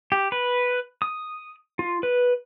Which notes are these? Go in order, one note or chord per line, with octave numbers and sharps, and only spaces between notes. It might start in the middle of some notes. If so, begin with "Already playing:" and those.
G4
B4
D#6
F4
B4